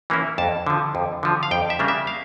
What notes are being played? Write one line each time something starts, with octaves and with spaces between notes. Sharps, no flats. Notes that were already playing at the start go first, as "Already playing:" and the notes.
E3 A#3 C#4 E4
F2 A5
D3 F3
F2
D3 F3
F5
F2 G5
E5
C#3 G3 A#3 D4
E5
F5